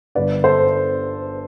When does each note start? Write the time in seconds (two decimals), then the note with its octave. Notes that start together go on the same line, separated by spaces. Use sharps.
0.15 G1 G2 D3 B4 D5
0.44 A4 C5